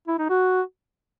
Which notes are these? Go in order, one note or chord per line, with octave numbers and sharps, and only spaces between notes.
E4
D#4
F#4